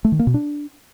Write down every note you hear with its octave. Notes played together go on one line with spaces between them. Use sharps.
A3
D#3
A#3
B2
D4